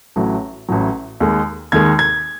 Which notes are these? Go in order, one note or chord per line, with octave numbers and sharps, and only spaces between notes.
A1 A2 F#3
A1 A2 F#3
D#2 D#3 G#3
D#2 D#3 G#3 G#6
G#6